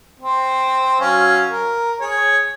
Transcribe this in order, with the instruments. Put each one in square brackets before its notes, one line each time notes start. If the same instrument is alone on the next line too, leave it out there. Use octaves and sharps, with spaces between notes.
[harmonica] C4
F#3 C#4 F5
A#4
G#4 C#5